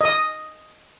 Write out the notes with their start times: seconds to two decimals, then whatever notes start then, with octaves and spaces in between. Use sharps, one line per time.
0.01 D#5 D#6